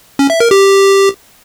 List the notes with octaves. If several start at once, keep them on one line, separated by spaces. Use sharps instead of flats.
C#4
E5
A#4
G4